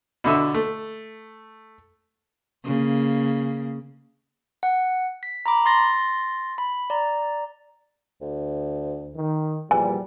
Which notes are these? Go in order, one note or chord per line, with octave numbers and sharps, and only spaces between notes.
B2 D3 E5 E6
A3
C#3 A#3
F#5
B6
A#5 B5 D6
C6 A6 A#6
B5
D5 A#5
D2
D#3
E2 A#2 F3 G3 G#5